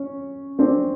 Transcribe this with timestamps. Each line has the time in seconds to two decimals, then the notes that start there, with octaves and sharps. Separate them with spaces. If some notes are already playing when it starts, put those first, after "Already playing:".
Already playing: C#4
0.59 C4 D4